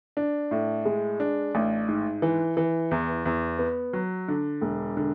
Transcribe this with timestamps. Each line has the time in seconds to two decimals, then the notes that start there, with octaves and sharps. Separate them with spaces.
0.17 D4
0.51 A2
0.85 G#3
1.20 D4
1.55 A1
1.88 G#2
2.22 E3
2.57 E3
2.91 E2
3.26 E2
3.59 B3
3.93 F#3
4.28 D3
4.61 E1
4.97 D3